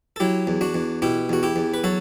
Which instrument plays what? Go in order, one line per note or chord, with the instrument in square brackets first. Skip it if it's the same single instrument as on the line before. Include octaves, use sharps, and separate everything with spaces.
[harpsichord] A4
F#3 E4 G4
E2
D4 F#4
E2
B2 E4 G4
E2 F#4
E4 G4
E2
B4
F#3 F#4 A4